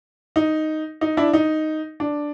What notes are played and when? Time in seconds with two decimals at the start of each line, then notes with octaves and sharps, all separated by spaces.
0.36 D#4
1.01 D#4
1.17 D4 E4
1.33 D#4
2.00 D4